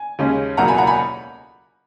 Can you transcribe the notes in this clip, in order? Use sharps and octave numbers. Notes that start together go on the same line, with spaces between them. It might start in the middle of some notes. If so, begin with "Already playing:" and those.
Already playing: G#5
D#2 C#3 G#3 C#4
C#2 B2 F#3 A#3 F#5 A#5
G#5 B5
F#5 A#5
G#5 B5